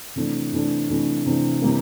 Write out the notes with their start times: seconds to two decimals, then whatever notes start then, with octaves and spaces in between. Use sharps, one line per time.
0.16 C3 E3 A3 D4
0.53 C3 E3 A3 D4
0.90 C3 E3 A3 D4
1.26 C3 E3 A3 D4
1.62 C3 E3 G3 A#3